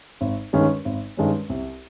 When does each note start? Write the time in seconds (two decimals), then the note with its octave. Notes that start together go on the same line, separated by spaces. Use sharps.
0.21 G#1
0.53 G2 D#3 G#3 C#4
0.85 G#1
1.17 G2 D#3 G#3 C#4
1.49 C2